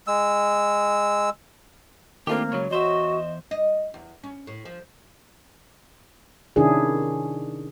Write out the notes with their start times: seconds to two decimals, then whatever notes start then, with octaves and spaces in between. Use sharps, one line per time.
0.07 G#3 E6
2.27 D#3 A3 A#3 C4 D4 F4 G4
2.52 C#2 C#3 F#3 C#5
2.70 E2 F#4 C5 D#5 E5
3.51 D#5
3.94 E2
4.24 C#4
4.47 A2
4.65 F3
6.56 C3 D#3 C#4 D4 E4 G#4